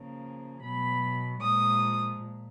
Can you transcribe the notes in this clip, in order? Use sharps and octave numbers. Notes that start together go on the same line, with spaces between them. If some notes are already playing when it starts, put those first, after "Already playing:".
Already playing: C#3 F3 A#3
B2 F#3 B3 B5
A#2 F3 G#3 D#6
A#2